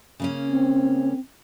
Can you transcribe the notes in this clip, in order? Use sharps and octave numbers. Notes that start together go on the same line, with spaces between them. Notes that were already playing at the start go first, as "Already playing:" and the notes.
C#3 A#3 C#4
C4